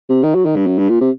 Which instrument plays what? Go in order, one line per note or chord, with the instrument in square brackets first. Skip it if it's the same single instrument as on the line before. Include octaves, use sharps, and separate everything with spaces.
[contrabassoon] C3
D#3
F#3
D#3
G2
F#2
G2
A#2
C3